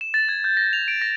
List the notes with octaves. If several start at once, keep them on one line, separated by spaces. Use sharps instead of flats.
E7
A6
G#6
G6
A#6
F7
D7
A#6